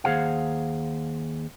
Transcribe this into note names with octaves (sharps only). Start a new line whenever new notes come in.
D#2 C#3 G#4 C5 F5 F#5